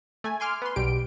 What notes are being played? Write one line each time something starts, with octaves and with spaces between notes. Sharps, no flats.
A3 G#5
G#5 C6 D6 F6
B3 C6
B1 B2 G3 G4 D7